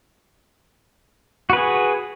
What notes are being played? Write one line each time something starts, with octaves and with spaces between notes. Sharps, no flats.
F#4 G#4 B4